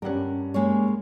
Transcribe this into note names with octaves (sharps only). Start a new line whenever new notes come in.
G2 G3 C#4 A#4 F#5
G#3 A#3 C#5